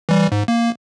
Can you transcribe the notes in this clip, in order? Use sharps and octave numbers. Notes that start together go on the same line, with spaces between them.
E3 G3
G#2
A#3